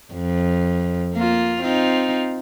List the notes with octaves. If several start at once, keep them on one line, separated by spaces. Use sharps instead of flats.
F2
A#3 F4
C4 D#4 F4